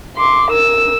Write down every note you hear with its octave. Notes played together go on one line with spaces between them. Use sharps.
C6 D6
A#4 E6